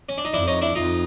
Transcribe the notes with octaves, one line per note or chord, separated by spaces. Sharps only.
C#4
D4
D#4
F2 D4 E4
C#4 D#4
D4 E4
F2 D#4 F4